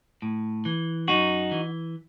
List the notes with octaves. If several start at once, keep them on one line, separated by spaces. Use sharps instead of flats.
A2
E3
F#2 D#4 F#4
E3